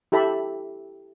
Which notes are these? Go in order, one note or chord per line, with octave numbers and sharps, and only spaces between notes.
E4 G4 A4 E5 A5 B5